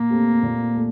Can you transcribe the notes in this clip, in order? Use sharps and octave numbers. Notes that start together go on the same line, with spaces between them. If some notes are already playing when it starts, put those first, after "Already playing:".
Already playing: A#2 A#3
A3 C4 G4
A#2
A3